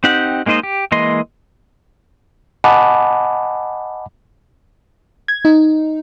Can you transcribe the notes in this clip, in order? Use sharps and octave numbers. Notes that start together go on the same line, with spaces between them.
C4 D#4 G4 F#5
G#3 A#3 D#4 C5 D#5
G4
E3 G#3 A#3 D#5 C6
D#5 F#5 G#5 A5 B5 D6
G#6
D#4